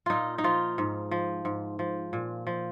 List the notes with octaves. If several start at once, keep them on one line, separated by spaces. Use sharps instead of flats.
A#2 D#4 F4
D#4
F3 F4
G#2
F3
G#2
F3
A#2
F3